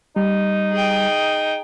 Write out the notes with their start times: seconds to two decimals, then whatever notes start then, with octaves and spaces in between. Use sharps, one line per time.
0.16 G3 D#4
0.72 G#4 G5